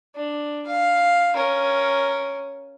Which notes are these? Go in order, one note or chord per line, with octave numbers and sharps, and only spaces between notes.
D4
F5
C#4 A#4